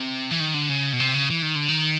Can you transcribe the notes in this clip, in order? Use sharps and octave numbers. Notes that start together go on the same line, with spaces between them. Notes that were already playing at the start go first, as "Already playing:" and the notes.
Already playing: C3
E3
D#3
D3
C#3
B2
C3
C#3
E3
D#3
D3
D#3